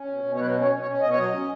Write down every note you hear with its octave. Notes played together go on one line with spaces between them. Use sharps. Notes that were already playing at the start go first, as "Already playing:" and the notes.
Already playing: C#4
B2
B2
C#5
F#3 B4
C#4
C#5
B2
C#5
C#4
B2 D#5
C#5
F#3 D#5
C#4